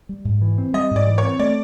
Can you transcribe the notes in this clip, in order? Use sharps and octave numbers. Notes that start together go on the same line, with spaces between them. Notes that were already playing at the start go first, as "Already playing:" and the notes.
G3
G#2
E3
C4
G3 D#5
G#2
D5
E3
C#5
C4
A3 D5